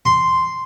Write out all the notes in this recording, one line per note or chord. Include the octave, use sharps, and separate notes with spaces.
C6